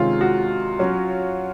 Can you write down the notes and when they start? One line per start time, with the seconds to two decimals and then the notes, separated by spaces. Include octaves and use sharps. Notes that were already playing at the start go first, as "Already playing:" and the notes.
Already playing: C3 D#3 G#3 C#4 F4
0.21 F#4
0.79 F#3 C#4 F#4